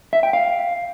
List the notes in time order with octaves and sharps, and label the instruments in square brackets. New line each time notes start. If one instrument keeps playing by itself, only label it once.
[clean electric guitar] E5
G5
F5